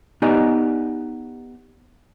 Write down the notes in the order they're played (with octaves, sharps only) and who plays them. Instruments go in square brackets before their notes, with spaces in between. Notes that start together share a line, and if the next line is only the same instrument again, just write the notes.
[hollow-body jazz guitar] B3 D#4 G4 D5 G#5